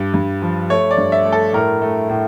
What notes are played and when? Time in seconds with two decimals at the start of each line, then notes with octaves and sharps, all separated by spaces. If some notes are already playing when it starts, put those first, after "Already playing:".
Already playing: G2
0.14 G2
0.42 F3
0.70 A3 C#5
0.91 D5
0.98 G2
1.12 E5
1.25 A3
1.32 A4
1.53 A2 A#4
1.81 A3
2.09 A2